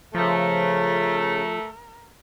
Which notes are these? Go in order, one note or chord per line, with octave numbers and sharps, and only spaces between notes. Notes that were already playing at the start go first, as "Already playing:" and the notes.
C#3 F3 A3 A#4